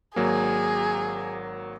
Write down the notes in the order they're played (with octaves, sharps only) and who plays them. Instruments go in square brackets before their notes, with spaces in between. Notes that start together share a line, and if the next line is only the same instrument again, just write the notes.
[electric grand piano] G#1 F#3 A#3 [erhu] G#4